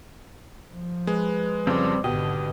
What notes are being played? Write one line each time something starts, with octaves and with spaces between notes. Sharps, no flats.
F3
G#3 B4
F2 C#3 F3 G3 C4
G#1 B2 D3 B3 G4 D#5